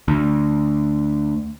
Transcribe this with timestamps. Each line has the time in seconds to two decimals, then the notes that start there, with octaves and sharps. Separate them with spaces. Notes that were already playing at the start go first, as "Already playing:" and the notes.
0.08 D2